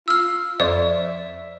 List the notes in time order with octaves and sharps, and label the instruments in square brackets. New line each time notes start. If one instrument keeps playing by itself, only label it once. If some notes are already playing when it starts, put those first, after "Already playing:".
[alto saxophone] F4 [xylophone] E6 F6
[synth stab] F2 [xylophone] D5 [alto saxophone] E5